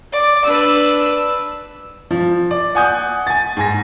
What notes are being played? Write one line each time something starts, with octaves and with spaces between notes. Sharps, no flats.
D5
D4 B4 E6
F3
D5
F#5 G#5 D#6 G6
G#5 A6
G#2 G#5 A#6